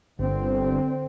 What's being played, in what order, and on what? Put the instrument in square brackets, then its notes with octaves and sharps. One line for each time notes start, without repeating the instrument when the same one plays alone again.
[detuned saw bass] G1 [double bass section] D3 C4